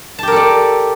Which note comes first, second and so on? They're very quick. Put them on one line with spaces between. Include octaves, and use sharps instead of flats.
A5 G4 A#4 A4 D5